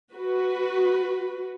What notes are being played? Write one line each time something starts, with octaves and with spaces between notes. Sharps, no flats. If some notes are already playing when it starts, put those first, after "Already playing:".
F#4 B4